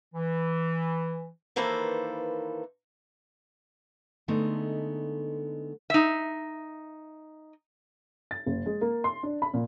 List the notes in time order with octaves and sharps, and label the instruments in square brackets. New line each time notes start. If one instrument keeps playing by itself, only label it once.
[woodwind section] E3
[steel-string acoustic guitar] D#3 E3 A#3 A4 B4 C5
D3 G#3 A3 B3 D#4
[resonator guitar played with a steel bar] D#4 E5
[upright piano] A6
F#1
G#3
A#3
C6
D4
B5
A#2